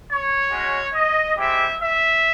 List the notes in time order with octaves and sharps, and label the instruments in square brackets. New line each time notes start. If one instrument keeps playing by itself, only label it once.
[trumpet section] C#5
G#3 C#4 F#4
D#5
G#3 C4 E4 G4 E5
E5